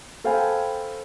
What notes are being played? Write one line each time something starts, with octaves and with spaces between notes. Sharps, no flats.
A4 C5 F5 G5 G#5 B5